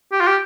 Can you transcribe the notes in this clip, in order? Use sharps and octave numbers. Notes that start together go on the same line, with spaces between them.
G4
F4
G4